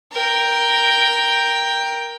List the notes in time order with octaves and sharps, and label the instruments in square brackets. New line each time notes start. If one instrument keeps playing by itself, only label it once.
[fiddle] A#4 G5